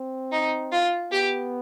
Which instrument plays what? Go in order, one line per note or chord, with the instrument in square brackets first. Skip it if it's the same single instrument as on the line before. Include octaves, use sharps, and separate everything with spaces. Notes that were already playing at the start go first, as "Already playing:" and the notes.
Already playing: [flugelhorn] C4
[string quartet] D#4
F4
[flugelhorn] B3 [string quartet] G4